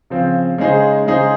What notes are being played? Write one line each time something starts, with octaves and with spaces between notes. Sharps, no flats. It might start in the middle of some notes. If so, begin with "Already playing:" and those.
C#3 F3 C4
C#3 G#3 D#4 G#4 C5
C#3 G#3 D#4 G#4 C5